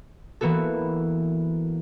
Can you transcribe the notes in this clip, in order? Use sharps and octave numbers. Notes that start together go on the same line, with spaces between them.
E3 A#3 B3 F#4 A4